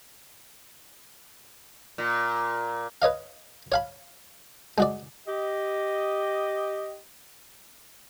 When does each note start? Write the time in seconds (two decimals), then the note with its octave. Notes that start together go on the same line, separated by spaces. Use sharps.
1.98 A#2
3.02 B4 C#5 D#5 F5
3.72 C#5 F5 B5
4.78 G#3 F#4 D5
5.28 G4 D#5